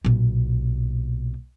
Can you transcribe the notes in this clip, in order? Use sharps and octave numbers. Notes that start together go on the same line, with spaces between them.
B1 A#2